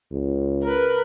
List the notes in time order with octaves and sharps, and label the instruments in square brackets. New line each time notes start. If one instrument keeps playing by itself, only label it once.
[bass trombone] C#2
[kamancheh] A#4 B4